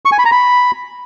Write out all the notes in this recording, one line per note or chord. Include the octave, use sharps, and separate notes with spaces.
C#6
G#5
B5
A#5
B5